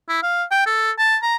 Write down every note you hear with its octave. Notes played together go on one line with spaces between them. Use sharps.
E4
F5
G5
A4
A5
A#5